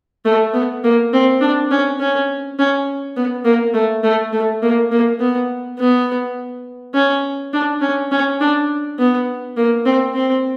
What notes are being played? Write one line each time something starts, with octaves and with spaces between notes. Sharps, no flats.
A3
B3
A#3
C4
D4
C#4
C#4
C#4
B3
A#3
A3
A3
A3
A#3
A#3
B3
B3
C#4
D4
C#4
C#4
D4
B3
A#3
C4
C4